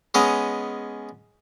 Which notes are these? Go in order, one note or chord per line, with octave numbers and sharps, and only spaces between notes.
G#3 B3 C#4 D#5